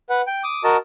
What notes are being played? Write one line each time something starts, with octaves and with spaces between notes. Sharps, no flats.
B4 F#5
G5
D6 D#6
F#4 A#4 D#5 A5